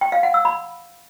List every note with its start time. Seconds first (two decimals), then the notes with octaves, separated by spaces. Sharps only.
0.01 G5
0.12 F5
0.23 F#5
0.34 E6
0.45 B5